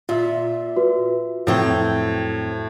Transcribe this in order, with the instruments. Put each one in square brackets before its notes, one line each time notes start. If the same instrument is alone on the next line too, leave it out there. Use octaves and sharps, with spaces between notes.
[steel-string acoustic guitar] A#2 [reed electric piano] F4 E5
[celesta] F#4 B4
[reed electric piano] F2 [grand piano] A2 [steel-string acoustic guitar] F#3 C4 G5